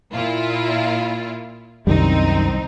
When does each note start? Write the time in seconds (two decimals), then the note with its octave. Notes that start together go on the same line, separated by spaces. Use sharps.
0.14 A#2 E4 F4
1.87 C2 F#2 D#3 G3 C4 D#4